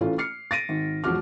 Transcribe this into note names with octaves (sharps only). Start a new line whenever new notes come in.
A2 E3 A3 C#4 F4
F6 C7 C#7
A6 A#6 D7 D#7
G#1
E1 F3 G#3 F#4 D6 F6